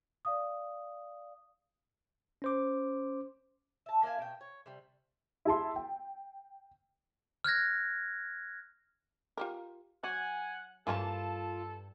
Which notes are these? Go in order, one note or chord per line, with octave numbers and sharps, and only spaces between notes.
D5 F5 D#6
C#4 C5 D6
E5 A5
A#3 E4 F5 G#5
B2 G5
C#5
C3 G3
E4 G#4 A5 C6
G5
F6 F#6 G#6 A#6
F4 G4 A#4
F#3 F#4 F#5 G#5
G2 E3 A#3 C#4 F4 A4 G#5 A5